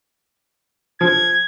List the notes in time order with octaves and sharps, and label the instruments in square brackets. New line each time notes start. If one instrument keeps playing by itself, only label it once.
[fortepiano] F3 [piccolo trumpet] G#6